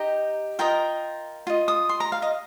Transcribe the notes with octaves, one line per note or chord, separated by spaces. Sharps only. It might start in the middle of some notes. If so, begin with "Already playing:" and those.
Already playing: D#4 G4 D#5 A#5
F4 A#4 D#5 G5
F4 D#5
D#6
C6
A#5
F5
D#5